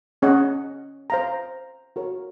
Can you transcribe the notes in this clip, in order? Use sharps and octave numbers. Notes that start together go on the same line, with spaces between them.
C#4 G#4 D#5 F#5
C5 F5 A#5
F#4 A#4 C#5